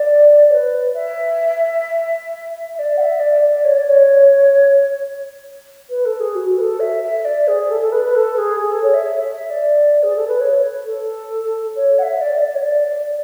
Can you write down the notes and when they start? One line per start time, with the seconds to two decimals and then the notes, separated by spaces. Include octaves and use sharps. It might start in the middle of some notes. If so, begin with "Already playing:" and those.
Already playing: D5
0.49 C#5
0.54 B4
0.94 E5
2.74 E5
2.79 D5
2.97 F#5
3.00 E5
3.19 D5
3.42 D5
3.64 C#5
3.76 D5
3.87 C#5
5.90 B4
6.05 A4
6.20 G#4
6.35 F#4
6.57 B4
6.61 A4
6.80 E5
7.02 E5
7.25 D5
7.48 G#4
7.70 A4
7.81 A4
7.92 B4
8.04 B4
8.15 A4
8.38 G#4
8.60 G#4
8.72 A4
8.83 C#5
8.94 E5
9.05 E5
9.28 E5
9.50 D5
10.03 G#4
10.16 A4
10.27 B4
10.40 C#5
10.85 A4
11.76 C#5
11.98 F#5
12.03 E5
12.21 D5
12.38 E5
12.42 D5
12.55 C#5
12.59 D5